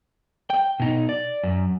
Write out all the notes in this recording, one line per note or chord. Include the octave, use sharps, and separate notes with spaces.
G5
B2 D#4
D5
F#2